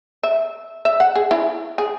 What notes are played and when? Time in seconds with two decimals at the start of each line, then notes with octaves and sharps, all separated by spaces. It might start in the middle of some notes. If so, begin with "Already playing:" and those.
0.23 E5
0.85 E5
1.00 F#5
1.15 G#4
1.31 E4
1.78 G#4